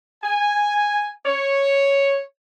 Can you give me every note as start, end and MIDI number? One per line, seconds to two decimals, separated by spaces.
0.23 1.10 80
1.26 2.20 73